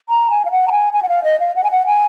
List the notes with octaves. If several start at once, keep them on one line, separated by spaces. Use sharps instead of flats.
A#5
G#5
F5
F#5
A#5
G#5
G#5
F#5
F5
D#5
F5
F#5
G#5
F#5
G#5